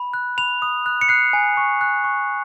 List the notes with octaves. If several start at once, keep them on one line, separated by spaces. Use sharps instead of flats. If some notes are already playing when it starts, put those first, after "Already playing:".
Already playing: B5
F#6
B5 F7
D#6
F#6
C#7
F#6 C7
G#5
C#6
F#6
C#6